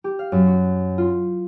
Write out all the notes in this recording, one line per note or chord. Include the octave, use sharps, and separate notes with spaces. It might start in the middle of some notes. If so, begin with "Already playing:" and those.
G4
F5
F#2
F#4
F4